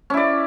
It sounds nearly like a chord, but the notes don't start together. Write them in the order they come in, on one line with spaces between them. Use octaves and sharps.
C#4 E4 D5